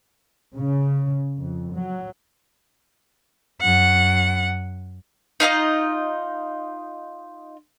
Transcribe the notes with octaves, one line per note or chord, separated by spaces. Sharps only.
C#3
F2
F#3
F#2 F#5
D#4 F4 C#5 D#5